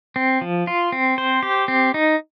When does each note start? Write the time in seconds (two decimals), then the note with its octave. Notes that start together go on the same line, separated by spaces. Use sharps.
0.16 C4
0.41 F3
0.67 F4
0.92 C4
1.18 C5
1.43 G4
1.68 C4
1.94 D#4